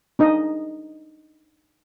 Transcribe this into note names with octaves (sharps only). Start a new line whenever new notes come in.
D4 D#4 D#5